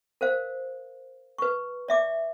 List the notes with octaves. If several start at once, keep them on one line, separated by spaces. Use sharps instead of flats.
A#4 C5 F5
B4 C#6
D5 E5 D6